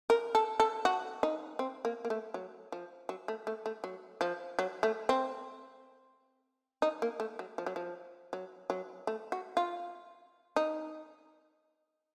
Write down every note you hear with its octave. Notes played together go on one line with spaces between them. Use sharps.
A#4
A4
A4
F#4
D#4
C4
A#3
A#3
A3
F#3
F3
F#3
A3
A3
A3
F#3
F3
F#3
A3
C4
D#4
A#3
A3
F#3
F3
F#3
F3
F#3
F#3
A3
F#4
F4
D#4